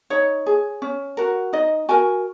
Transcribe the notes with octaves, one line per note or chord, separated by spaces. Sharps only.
D#4 C#5
G#4
C#4
F#4 A#4
D#4 D#5
F#4 A#4 G#5